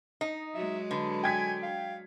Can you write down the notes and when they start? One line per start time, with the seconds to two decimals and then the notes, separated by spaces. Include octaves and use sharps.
0.21 D#4 D#5
0.54 F#3 G#3 E5
0.91 D3 B4
1.23 G5 G#5 G#6 B6
1.63 F5